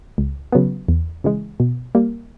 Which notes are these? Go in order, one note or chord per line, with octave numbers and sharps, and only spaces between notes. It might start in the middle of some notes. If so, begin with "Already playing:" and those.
C#2
C#3 F#3 B3
E2
C#3 E3 G#3
B2
G3 A#3